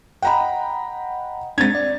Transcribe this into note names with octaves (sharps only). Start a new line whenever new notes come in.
D#5 F#5 G5 A#5 B5
G#3 C4 D4 G#6 A6
D5